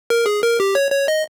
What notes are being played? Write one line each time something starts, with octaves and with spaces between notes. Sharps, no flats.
A#4
G#4
A#4
G4
C#5
C#5
D#5